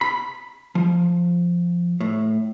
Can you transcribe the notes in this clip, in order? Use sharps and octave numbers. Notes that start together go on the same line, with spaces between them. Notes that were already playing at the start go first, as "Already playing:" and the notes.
B5
F3
A2